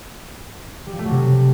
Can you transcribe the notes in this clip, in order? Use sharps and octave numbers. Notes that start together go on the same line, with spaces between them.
G3
F3
A3
F#3
C3